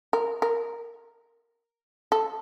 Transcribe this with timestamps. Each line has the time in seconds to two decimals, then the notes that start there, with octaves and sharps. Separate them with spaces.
0.13 A#4
0.42 A#4
2.12 A4